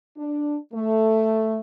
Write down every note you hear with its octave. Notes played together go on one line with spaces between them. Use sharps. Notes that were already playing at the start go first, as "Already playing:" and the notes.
D4
A3